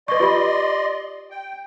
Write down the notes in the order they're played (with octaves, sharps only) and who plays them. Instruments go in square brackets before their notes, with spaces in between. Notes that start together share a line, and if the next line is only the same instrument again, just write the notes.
[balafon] B4 C#6 [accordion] D5 D#5 C6
[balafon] F4 G4 B5
[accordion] G5